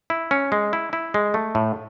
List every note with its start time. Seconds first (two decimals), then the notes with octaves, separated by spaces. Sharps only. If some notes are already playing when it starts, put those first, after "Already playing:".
0.10 E4
0.31 C#4
0.52 G#3
0.73 E4
0.93 E4
1.14 G#3
1.34 A3
1.55 A2